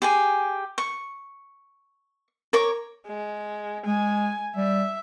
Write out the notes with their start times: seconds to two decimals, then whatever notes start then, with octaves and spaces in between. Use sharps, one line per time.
0.02 G4 G#4 G#5
0.78 C#6
2.53 A#4 C#5 D6
3.08 G#3
3.86 G#3 G#5
4.56 G3 E5